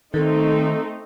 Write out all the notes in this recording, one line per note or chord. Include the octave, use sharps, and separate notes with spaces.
D#3 A3 C4 D#4 A4